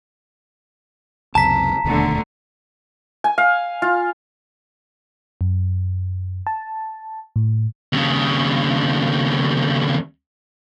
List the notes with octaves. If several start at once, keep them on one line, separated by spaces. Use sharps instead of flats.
C#2 F#2 C3 A5 A#5 B6
E1 D#2 B2 D3 A3
G#5
F5
F4
F#2
A5
A2
D#2 C#3